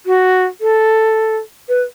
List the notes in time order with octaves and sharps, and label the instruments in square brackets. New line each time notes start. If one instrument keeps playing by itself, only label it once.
[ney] F#4
A4
B4